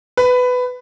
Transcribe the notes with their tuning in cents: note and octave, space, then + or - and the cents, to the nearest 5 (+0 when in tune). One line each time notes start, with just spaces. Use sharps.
B4 +15